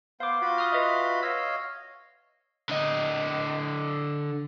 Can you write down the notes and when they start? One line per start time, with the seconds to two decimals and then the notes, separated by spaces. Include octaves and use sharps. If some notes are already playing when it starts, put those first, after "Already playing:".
0.20 B3 C5 F5 D6
0.42 F4 F#4 B5
0.58 C6 D#6 F6
0.72 B4 D#5 E5
1.23 C#5 D#5 F5 E6
2.70 D3 D#5